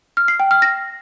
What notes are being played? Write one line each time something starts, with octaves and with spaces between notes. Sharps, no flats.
F6
C7
G5
F6
A#6